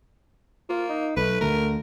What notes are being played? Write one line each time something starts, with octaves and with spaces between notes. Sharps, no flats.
A#3 F4
D#4
B1 A3 B4
D2 D3 A#4